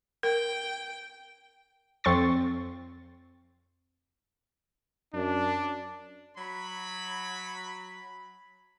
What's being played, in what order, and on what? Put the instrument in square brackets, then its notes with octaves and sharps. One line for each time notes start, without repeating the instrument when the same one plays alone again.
[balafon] A#4 [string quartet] G5
[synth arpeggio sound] F2 C4 C6 C#6 A6
[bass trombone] F#2 [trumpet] D4
[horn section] F#3 B5